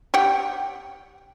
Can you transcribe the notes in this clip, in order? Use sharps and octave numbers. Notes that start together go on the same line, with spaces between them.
G4 F#5 G5